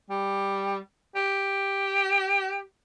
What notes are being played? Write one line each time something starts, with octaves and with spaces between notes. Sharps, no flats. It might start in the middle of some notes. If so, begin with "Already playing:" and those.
G3
G4